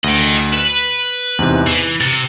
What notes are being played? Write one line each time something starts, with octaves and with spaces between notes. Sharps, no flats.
D2 D#5 G5
B4 E7
E2 G#2 C3
E3 C7
C3 A6